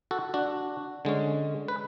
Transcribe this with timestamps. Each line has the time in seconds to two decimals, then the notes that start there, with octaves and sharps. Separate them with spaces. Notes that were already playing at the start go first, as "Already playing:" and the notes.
0.11 F#4 A4
0.34 D4 F#4
1.05 D3 G#3 C#4
1.68 B4